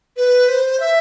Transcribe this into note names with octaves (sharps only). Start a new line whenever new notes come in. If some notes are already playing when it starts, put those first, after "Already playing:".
B4
C5
E5